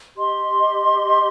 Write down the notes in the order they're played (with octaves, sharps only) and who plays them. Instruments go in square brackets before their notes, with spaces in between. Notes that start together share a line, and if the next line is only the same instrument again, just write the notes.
[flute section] G4 D#5 C6